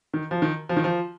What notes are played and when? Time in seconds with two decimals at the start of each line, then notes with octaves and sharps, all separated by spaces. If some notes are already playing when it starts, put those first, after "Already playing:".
0.13 D#3
0.31 F3
0.42 D#3
0.69 F3
0.76 D#3
0.84 F3